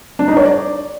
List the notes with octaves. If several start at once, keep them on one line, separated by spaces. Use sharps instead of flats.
D4
D#4
C#5
D5